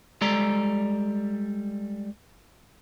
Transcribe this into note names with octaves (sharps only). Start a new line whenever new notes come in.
G3 G#3 A4 D5 A#5